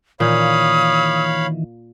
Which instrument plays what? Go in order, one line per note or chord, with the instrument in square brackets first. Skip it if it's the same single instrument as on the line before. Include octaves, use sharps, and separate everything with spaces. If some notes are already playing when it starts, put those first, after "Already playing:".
[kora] A#2 A#3 [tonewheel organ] D#3 E3 [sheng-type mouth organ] C#5 F5 B5 [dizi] D#6